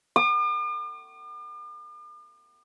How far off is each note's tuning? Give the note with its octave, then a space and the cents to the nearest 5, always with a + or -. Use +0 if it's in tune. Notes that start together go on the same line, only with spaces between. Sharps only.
D6 +45